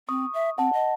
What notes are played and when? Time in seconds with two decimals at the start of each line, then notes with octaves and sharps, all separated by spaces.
0.09 C4 C#6 D#6
0.34 E5
0.58 C4 F#5 A5
0.73 D#5